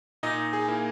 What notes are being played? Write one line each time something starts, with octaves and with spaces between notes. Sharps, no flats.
A#2 D#4 D#5
G#4
A#3 E4